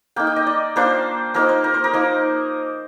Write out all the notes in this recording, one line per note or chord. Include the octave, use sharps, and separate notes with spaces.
A#3 D#4 G5
G5
D#5
D5
A#3 D4 F4 C5
F3 A#3 D#4 A#4
C5
A#4
C5
A#4
F3 A#3 D#4